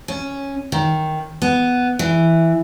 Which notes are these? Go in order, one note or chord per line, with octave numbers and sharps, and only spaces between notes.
C#4
D#3
B3
E3